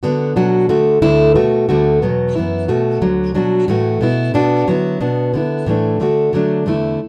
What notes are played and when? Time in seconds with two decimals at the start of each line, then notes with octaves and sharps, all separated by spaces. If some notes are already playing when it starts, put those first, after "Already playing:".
0.03 D3 B3 D4 F#4
0.36 B2 F#3 D4 F#4
0.69 D3 A3 F#4
1.02 D2 D3 A3 E4
1.36 B2 A3 F#4
1.69 D2 D3 A3 F#4
2.02 E2 B2 F#3 B3
2.35 F#2 E3 B3 E4
2.68 B2 A3 F#4
3.01 D2 D3 F#3
3.34 B2 F#3 D4 F#4
3.68 A2 E3 A3 F#4
4.01 B2 B3 E4
4.34 B2 B3 D4 F#4
4.67 D3 F#3 B3 E4
5.00 B2 B3 D4 F#4
5.34 D3 B3 E4
5.66 A2 E3 A3 D4
6.00 D3 A3 D4 F#4
6.33 D3 F#3 A3 D4
6.66 E2 D3 A3 E4